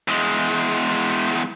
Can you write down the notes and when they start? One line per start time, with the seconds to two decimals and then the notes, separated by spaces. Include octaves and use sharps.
0.08 E2 G#3